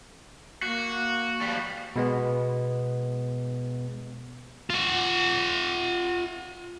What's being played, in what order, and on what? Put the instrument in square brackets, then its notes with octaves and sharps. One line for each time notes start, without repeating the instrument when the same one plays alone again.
[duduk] A#3 [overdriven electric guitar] F#4
[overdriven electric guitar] F3 G3
[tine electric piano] B2 G#3 B3
[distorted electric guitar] F4 F#5